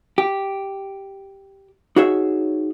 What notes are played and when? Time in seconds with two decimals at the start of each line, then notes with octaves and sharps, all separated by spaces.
0.18 G4
1.96 D#4 F#4 G#4 C#5 E5